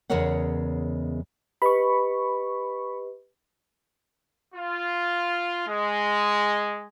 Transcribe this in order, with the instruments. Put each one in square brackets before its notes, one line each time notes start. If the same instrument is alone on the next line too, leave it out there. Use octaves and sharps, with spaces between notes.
[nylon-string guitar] E2 C#3 G#3 A#4 C#5 F#5
[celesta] G4 B4 D#5 [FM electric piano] B5 C#6
[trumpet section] F4
G#3